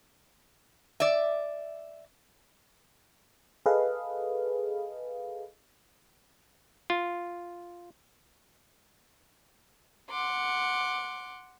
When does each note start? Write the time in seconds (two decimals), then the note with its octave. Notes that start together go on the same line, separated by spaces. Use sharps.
1.00 D5 E5
3.66 G#4 A4 B4 D#5 F5
6.90 F4
10.11 F#5 C6 D6